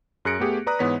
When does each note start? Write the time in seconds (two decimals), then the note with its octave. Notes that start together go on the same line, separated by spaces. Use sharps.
0.25 F#2 G#4 F#6 A#6 C#7 D7
0.40 A3 B3 G4 G#4
0.67 B4 D5 A#5 D#6 F#6
0.79 G#2 E3 B3 C#5 B6